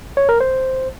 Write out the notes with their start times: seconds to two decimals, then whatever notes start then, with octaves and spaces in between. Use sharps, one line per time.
0.17 C#5
0.29 A#4
0.41 C5